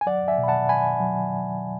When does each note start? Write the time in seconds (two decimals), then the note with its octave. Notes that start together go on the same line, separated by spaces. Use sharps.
0.01 G#5
0.06 F#3 D5 F#5
0.28 E5 G#5
0.38 B2
0.44 B5
0.48 F#5 A5
0.69 B2 G#5 B5
1.00 F#3